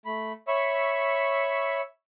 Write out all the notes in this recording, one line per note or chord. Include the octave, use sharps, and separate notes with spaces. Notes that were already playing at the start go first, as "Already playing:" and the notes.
A3 B5
C#5 E5 B5 C#6 E6